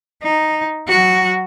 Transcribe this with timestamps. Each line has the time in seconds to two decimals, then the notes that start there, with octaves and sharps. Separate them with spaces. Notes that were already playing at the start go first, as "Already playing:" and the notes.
0.22 D#4
0.88 F#3 F#4